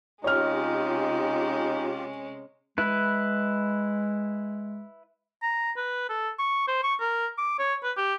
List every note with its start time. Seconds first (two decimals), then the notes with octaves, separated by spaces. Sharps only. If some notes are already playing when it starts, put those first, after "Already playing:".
0.24 C3 G#3 C#4 D#4 F4 G4 C#5 F6
2.78 G#3 E4 B4
5.42 A#5
5.77 B4
6.09 A4
6.39 C#6
6.68 C5
6.84 C#6
7.00 A#4
7.38 D6
7.59 C#5
7.83 B4
7.97 G4